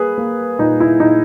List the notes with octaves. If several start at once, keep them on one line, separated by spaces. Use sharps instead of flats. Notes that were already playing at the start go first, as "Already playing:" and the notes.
Already playing: A#3 G#4 B4
A#3
A#2 D#4
E4
A#2 D#4